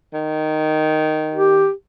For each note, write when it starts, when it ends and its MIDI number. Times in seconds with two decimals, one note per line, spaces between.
0.13 1.65 51
1.34 1.71 67